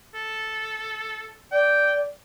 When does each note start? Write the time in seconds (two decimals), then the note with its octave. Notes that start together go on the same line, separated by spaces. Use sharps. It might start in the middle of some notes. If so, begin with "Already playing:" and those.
0.14 A4
1.52 D5 G5